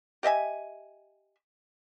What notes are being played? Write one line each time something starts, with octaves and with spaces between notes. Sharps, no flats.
G4 D#5 E5 G#5